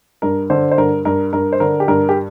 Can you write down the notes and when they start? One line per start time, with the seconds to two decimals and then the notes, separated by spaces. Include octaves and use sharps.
0.22 G2 A#4
0.50 D3 C5
0.71 C5
0.78 G2 A#4
1.05 G2 A#4
1.33 G2 A#4
1.53 C5
1.60 D3 A#4
1.80 G4
1.88 G2 A#4
2.09 G4